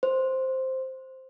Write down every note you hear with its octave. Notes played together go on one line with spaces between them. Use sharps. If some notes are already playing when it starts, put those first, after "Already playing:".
C5